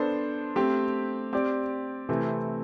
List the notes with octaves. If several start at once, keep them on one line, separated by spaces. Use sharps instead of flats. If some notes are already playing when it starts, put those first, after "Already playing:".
Already playing: B3 D4 A4 C5
A3 C4 G4
C4 G4 D5
C3 E3 A3 C4 E4